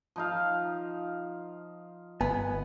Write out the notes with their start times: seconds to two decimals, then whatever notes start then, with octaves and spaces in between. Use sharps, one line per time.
0.16 F3 D#4 F5
2.21 G1 B3 G#5